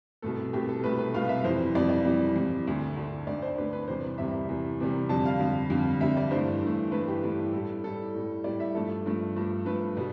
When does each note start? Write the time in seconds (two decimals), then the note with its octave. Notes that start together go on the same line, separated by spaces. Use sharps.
0.22 C2 B2 A3 A4
0.53 C2 B2 A3 G4
0.69 A4
0.83 C2 B2 A3 B4
0.99 B4
1.14 C2 B2 A3 F5
1.29 E5
1.44 F2 E3 G3 C5
1.75 F2 E3 G3 D5
1.90 D5
2.05 F2 E3 G3
2.36 F2 E3 G3
2.67 D2 D3 A3
2.96 D2 D3 A3
3.27 D2 D3 A3 D5
3.42 C5
3.58 D2 D3 A3 B4
3.73 B4
3.87 E2 C3 G3 C5
4.18 E2 C3 G3 E5
4.49 E2 C3 G3
4.80 E2 C3 G3
5.09 F2 D3 G3 A5
5.26 F5
5.40 F2 D3 G3
5.70 F2 D3 G3
6.01 F2 D3 G3 E5
6.17 D5
6.31 G2 E3 A3 C5
6.62 G2 E3 A3
6.92 G2 E3 A3 B4
7.08 G4
7.23 G2 E3 A3
7.53 A2 G3 A4
7.84 A2 G3 A4
8.14 A2 G3
8.44 A2 G3 D5
8.60 E5
8.75 G2 F3 A3 A4
9.06 G2 F3 A3
9.36 G2 F3 A3
9.66 G2 F3 A3 B4
9.97 B2 G3